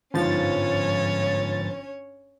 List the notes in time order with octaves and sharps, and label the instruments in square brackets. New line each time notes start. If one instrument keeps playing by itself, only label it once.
[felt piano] G1 F4 C5 [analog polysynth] G#2 F3 A6 [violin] C#4 C#5